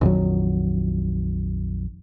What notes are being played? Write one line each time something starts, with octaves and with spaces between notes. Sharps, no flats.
A#1 F2 D#3 F#3